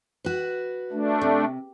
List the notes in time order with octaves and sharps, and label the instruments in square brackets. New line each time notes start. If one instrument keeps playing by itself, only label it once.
[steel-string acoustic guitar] F#4 B4
[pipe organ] A3 D4
[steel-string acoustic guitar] C3